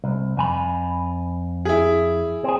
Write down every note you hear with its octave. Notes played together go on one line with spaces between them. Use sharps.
C2
F2 G#5 B5
E4 G#4
C4 G#4